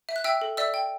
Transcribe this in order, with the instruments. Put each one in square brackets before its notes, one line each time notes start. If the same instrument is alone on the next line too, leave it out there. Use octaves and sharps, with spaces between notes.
[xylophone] E5
F#6
E5 G5 E6
A4
D5 E5 E6
G5